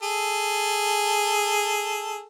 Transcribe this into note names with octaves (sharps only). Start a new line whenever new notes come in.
G#4 A4